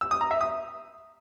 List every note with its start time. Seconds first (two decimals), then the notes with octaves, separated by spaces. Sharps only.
0.01 E6
0.11 D#6
0.21 A#5
0.31 E5
0.41 D#6